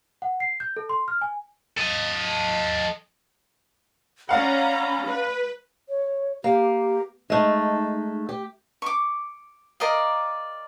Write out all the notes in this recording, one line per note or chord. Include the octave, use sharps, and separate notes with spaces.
F#5
C7
G6
A4
C6
F6
G#5
A4 D#5
C#4 D5 F5 F#5 A#5 B5
B4
C#5
A#3 G4
G#3 A3 D#4
G4
C#6 D6
A#4 D5 D#5 F5